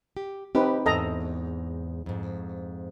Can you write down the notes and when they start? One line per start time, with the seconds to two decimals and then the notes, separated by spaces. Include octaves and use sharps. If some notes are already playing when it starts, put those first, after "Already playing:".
0.17 G4
0.55 C4 D#4 G4 B4
0.86 E2 G#2 A4 D#5 A#5
2.06 F2 G#2